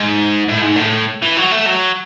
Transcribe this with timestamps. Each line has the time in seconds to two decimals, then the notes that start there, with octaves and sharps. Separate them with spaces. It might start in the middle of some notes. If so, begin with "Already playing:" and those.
Already playing: G#2
0.49 A2
0.62 G#2
0.76 A2
1.22 E3
1.37 F#3
1.51 A3
1.66 F#3